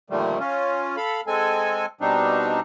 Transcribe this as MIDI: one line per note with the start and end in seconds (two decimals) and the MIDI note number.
0.10 0.39 46
0.10 0.39 50
0.10 0.39 51
0.10 0.39 53
0.10 0.39 55
0.10 0.39 57
0.39 0.96 61
0.39 0.96 65
0.97 1.21 69
0.97 1.21 77
0.97 1.21 83
1.27 1.86 56
1.27 1.86 60
1.27 1.86 69
1.27 1.86 80
2.01 2.60 47
2.01 2.60 55
2.01 2.60 60
2.01 2.60 62
2.01 2.60 63